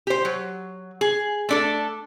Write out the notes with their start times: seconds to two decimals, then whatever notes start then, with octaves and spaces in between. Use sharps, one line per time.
0.07 G4 C5
0.25 F#3
1.01 G#4
1.49 A3 D4 A4